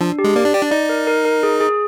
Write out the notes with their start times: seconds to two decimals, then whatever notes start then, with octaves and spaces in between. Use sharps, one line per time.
0.01 F3 D4
0.19 G4
0.24 G#3
0.36 A#3 D5
0.45 D4
0.54 G4 D5
0.63 D4
0.71 D#4 D5
0.89 A#4
1.07 A#4
1.25 A#4
1.43 G#4
1.60 G#4